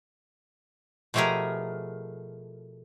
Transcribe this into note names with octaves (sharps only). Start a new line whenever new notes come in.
B2 F3 A3 G4 G#4 A#4